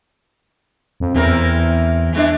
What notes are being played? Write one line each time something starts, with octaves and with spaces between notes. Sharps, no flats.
F2
E2 E3 C4 A#4
E3 G#3 D4